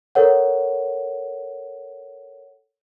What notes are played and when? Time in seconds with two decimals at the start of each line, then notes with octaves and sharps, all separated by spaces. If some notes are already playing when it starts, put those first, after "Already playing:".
0.15 A4 A#4 C#5 F#5